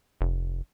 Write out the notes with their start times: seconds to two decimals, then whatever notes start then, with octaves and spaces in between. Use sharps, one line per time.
0.21 F1